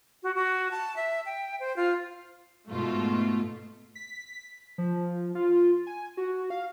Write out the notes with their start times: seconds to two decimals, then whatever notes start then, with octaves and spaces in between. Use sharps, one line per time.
0.23 F#4
0.35 F#4
0.71 A5
0.96 E5
1.26 G5
1.60 C5
1.76 F4
2.69 G#2 B2 A3 F4
3.95 B6
4.78 F3
5.35 F4
5.87 G#5
6.17 F#4
6.50 F5